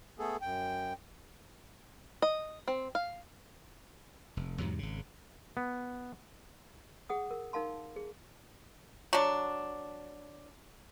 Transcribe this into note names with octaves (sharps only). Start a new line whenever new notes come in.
A3 B3 G#4 A4
F#2 G5
D#5
C4
F5
F1
E2 G#2 C3 F#3
G#1 C#3
B3
G#4 F#5 D#6
A#4
D#4 A#4 F5 A5 C6
G#4
F#3 D4